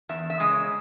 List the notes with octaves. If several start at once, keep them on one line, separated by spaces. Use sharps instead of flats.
E2 E5
E5
C#3 G#3 D#5
C#5